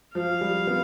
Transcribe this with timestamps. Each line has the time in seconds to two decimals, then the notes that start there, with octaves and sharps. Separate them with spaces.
0.15 F3 F5
0.41 G3
0.67 B3